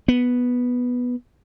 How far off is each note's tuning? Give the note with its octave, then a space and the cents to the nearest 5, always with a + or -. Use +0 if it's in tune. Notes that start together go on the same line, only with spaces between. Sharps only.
B3 -5